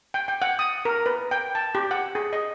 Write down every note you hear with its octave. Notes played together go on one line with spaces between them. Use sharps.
G5
G5
F#5
D#6
A#4
B4
G5
A5
G4
F#5
G#4
D#5